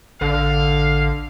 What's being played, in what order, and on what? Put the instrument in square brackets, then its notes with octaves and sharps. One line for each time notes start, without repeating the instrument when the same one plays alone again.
[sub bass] A1 [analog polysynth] D3 [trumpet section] F5